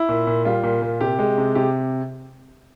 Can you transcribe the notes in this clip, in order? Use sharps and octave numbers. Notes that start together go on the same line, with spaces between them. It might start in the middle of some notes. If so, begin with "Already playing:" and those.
Already playing: E4
A#2
A#2
G3 F4
A#2
A#2
C3 G4
G#3
C3
C3 G4